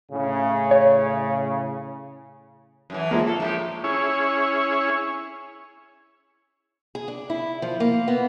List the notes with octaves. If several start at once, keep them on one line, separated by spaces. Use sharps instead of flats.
A2 C#3
C#5
F#2 A2 E3
F3 G#3 A#3
A4
A2 D#4 G4
C#4 E4 G#4 C#5
G#4
D4
E4
F3
A#3
B3